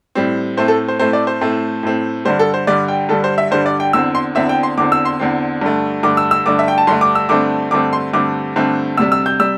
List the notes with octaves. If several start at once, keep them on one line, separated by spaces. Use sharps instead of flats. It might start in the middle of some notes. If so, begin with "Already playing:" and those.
A2 G3 C4
A2 A3 C4 C5
A4
C5
A2 A3 C4 C5
D5
C5
A2 A3 C4
A2 A3 C4
G2 D3 G3 C5
A4
C5
G2 D3 G3 D5
G5
G2 D3 G3 A4
C5
E5
G2 D3 G3 C5
D5
G5
E2 D3 C4 E6
C6
E2 D3 C4 E5
G5
C6
E2 D3 C4 D6
E6
C6
E2 D3 C4
G2 D3 A3
G2 D3 A3 D6
E6
E6
G2 D3 A3 D6
E5
G5
A5
G2 D3 A3 C6
D6
E6
G2 D3 A3 C4 D6
G2 D3 A3 C4 D6
C6
G2 D3 A3 C4 D6
G2 D3 A3 C4
D2 C3 G3 E6
E6
G6
C3 G3 E6